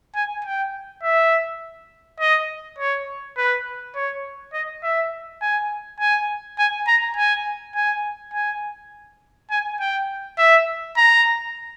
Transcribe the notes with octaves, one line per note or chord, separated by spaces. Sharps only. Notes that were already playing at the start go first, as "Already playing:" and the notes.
G#5
G5
E5
D#5
C#5
B4
C#5
D#5
E5
G#5
G#5
G#5
A#5
G#5
G#5
G#5
G#5
G5
E5
A#5